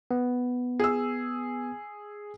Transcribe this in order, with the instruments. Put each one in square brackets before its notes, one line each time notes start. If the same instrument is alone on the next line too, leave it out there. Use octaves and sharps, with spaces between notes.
[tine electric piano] B3
[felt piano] G#4 E6